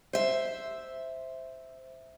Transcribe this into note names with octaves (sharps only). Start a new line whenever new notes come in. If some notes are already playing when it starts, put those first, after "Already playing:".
C5 E5